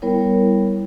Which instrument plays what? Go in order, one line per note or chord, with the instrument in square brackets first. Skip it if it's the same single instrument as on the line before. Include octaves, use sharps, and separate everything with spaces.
[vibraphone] G3 B3 E4 A#4 C#5